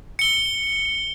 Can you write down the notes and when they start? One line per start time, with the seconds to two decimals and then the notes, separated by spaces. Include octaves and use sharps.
0.19 C#7 G7